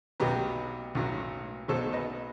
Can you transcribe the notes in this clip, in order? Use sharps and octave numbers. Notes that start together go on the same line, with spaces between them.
B1 B2 F#3 G4 B4
B1 A2 F#3
B1 B2 F#3 A4 C5
B4 D#5